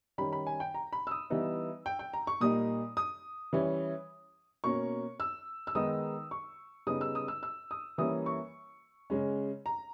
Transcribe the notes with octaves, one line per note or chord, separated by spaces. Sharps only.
D#3 G3 C#4 B5
B5
G#5
G5
A#5
B5
E6
D#6
E3 G3 B3 D#4
G5
G5
A#5
C#6
A#2 G3 A#3 D#4 D#6
D#6
E3 G3 C#4
B2 A#3 C#4 C#6
E6
E6
D#3 G#3 B3 D#4 D#6
C#6
C#3 G3 B3 D#4 D#6
E6
D#6
E6
E6
D#6
E3 G3 A#3 C#4 D#6
C#6
C#3 G#3 C#4
A#5